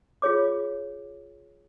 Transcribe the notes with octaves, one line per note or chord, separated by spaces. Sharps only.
F4 G#4 C#5 D6